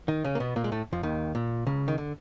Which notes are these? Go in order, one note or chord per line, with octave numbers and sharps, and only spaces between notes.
D#3 D#4
C#3 C#4
A#3
B2 B3
A#2 A#3
G#3
A2 A3
F2 F3
D#2 D#3
A#2
C#2 C#3
D#3
D3